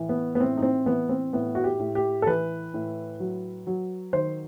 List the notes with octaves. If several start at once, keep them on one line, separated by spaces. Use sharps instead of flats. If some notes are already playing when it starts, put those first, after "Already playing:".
Already playing: A2 E3
B3
B3
A2 C4
D#4
C4
E3 B3
C4
A2 B3
F#4
G4
A2
G4
A4
E3 B4
A2
F#3
F#3
D#3 C5